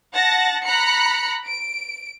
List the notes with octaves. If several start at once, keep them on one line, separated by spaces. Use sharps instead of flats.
F#5 A5 A6 A#6
A#5 B5 F#6 C#7
D7